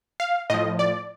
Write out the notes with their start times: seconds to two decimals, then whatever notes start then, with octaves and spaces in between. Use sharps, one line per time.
0.20 F5
0.50 A2 F3 D#5
0.79 D5